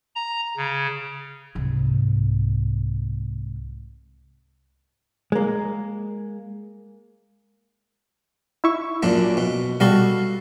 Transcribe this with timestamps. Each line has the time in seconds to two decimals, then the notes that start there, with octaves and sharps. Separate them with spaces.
0.15 A#5
0.57 C#3
1.55 C2 G#2
5.32 G#3 A#3
8.64 E4 E5 C#6
9.03 F#2 A#2 D4
9.37 B2
9.80 B2 G3 F#4 A4 F5